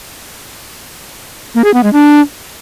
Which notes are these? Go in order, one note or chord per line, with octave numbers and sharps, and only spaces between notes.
A#3
G#4
B3
G#3
D4